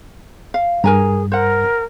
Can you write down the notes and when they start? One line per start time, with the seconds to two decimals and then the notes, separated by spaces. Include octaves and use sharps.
0.54 F5
0.84 G2 G#4 A#4 G#5 A#5
1.32 A#4 C5 F#5